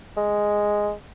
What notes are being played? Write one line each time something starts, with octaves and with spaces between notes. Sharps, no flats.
G#3